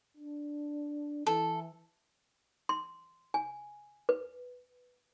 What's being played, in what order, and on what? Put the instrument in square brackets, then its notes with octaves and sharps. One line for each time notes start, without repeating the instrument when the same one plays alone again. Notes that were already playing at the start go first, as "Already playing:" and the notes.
[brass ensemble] D4
[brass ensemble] E3 [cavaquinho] A4
[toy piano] C6
G#5
B4